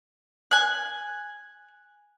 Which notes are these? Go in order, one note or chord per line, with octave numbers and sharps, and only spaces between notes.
G#5 F#6